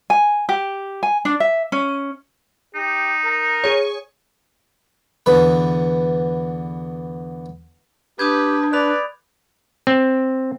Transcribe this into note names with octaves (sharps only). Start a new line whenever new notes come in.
G#5
G4
G#5
D4
E5
C#4
D#4 G4
A#4
G#4 C#5
E2 D3 B4
D4 G4 B4 D#6 G6 G#6
B4 D5 B5 F#6
C4